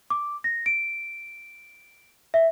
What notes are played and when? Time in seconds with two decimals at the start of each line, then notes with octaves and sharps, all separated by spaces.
0.10 D6
0.44 A#6
0.66 D7
2.34 E5